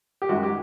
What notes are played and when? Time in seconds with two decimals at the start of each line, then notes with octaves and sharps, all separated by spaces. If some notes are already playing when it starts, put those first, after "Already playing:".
0.22 G4
0.29 F#2 D#3 G#3 F#4
0.43 G4